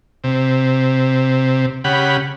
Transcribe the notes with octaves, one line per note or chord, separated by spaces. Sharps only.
C3
C#3 G4 F#5 B5